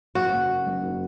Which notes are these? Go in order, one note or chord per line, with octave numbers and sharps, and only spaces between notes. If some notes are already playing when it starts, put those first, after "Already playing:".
F#1 F#4
F#1
F#2
F#1
F#3